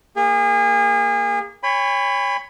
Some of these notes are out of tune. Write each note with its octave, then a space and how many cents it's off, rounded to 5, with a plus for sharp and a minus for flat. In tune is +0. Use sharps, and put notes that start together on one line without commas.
A#3 +0 G#4 -30
C#5 +0 G#5 -45 B5 +20